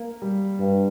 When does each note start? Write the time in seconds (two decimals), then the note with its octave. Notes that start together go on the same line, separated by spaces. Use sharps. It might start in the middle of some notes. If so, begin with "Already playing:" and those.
Already playing: A#3
0.22 G3
0.59 G2